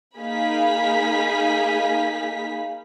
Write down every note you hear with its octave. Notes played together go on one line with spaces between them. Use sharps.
A#3 D#4 G#4 F5 B5 B6